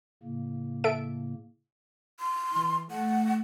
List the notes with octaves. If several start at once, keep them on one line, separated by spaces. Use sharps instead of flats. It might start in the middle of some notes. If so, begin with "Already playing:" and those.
A2 C#3 A#3
A4 E5 D7
C6
E3
A3 F#5